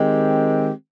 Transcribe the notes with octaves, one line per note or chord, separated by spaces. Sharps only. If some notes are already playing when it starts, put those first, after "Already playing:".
Already playing: D#3 G#3 C4 G4